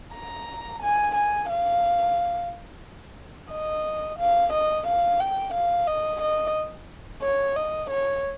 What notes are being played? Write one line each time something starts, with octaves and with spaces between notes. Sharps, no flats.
A#5
G#5
G#5
F5
D#5
F5
D#5
F5
G5
F5
D#5
D#5
C#5
D#5
C#5